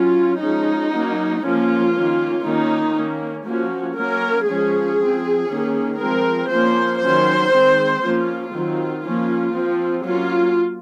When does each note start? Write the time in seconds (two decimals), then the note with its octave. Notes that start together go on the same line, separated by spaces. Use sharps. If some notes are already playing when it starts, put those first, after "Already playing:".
Already playing: F#3 C#4 F4
0.40 F3 G#3 C#4 D#4
0.91 F#3 A#3 C#4
1.42 F3 A#3 C#4 F4
1.92 D#3 A#3 C#4
2.43 D#3 A#3 C#4 D#4
2.94 D#3 A#3 C#4
3.45 F3 A#3 C#4 F#4
3.95 F#3 A#3 C#4 A#4
4.46 F3 G#3 C#4 G#4
4.97 F3 C4
5.49 D#3 A#3 C#4
5.99 F3 G#3 C4 A#4
6.50 F3 A#3 C#4 C5
7.00 D#3 F#3 C#4 C5
7.51 D#3 G#3 C4
8.02 F3 A#3 C#4 F4
8.53 D#3 F#3 C4 F4
9.04 F3 A#3 C#4
9.55 F3 C4
10.05 F#3 A#3 C#4 F4